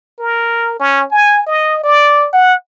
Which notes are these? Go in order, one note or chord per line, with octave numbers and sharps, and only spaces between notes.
A#4
C#4
G#5
D#5
D5
F#5